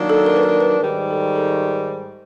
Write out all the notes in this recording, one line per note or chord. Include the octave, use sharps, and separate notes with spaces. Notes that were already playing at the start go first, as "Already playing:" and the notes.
Already playing: D#3 F#3 A#3 D4
A4
A#4
B4
A#4
B4
G#2 D#3 G3
A4
A4